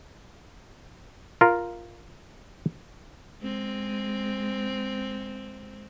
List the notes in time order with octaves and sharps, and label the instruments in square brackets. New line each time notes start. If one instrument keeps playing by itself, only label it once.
[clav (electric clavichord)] F4 A#4
[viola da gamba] G#3 C4